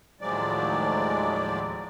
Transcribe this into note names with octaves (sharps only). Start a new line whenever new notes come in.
D#2 A2 F3 F#3 G#3 D5